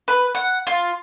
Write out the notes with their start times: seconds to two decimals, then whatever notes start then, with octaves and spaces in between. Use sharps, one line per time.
0.08 B4
0.35 F#5
0.67 F4